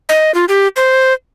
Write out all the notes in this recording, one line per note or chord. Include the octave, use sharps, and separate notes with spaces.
D#5
F4
G4
C5